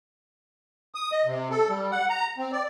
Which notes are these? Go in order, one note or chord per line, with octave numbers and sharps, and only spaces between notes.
D#6
D#5
C3
A4
G3
F#5
A#5
C4
D5